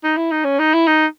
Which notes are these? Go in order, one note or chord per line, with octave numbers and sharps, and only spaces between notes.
D#4
E4
D#4
C#4
D#4
E4
D#4